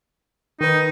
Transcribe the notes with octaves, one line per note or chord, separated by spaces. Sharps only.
D#3 D#4 B4